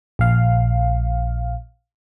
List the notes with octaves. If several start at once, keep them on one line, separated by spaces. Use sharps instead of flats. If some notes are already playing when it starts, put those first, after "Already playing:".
A#1 F5